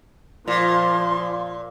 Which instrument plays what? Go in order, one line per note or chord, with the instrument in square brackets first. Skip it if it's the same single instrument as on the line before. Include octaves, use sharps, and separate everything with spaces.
[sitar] A#2 [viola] F3 [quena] C6